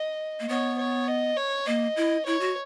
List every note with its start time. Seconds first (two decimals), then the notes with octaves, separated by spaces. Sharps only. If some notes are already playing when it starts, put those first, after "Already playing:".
Already playing: D#5
0.40 A#3
0.49 B3 C#5
0.79 C#5
1.08 D#5
1.37 C#5
1.67 A#3 D#5
1.96 E4
2.26 E4 C#5
2.40 F#4